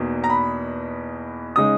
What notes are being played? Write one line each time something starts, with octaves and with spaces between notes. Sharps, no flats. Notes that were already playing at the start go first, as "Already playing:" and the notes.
Already playing: E2 B2 A#3 D#4
A#5
B5
C#3 G#3 D#4 D#6